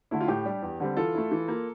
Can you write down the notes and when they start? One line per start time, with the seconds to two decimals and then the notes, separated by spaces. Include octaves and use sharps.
0.11 D3 A3 E4
0.21 F4
0.28 A2 G4
0.45 G3 D4
0.62 E2
0.80 D3 G3 C4
0.97 E3 F4 A4
1.15 A3 E4
1.31 E3
1.48 A#3 F4